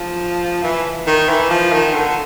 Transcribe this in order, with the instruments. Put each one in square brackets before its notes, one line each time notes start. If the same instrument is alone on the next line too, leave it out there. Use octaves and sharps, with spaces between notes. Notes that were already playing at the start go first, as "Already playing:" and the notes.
Already playing: [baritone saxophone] F3
E3
D#3
E3
F3
D#3
D3